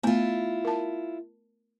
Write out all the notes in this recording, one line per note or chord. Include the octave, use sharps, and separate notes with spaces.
A3 B3 E4 F4
A#4 A5